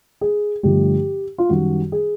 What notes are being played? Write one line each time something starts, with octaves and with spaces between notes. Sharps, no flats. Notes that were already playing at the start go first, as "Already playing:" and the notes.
G#4
G2 D3 F3 A3 G4
F4
F#2 D#3 G3 F#4
G#4